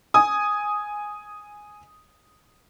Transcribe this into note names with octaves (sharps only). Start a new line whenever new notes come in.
G#5 D#6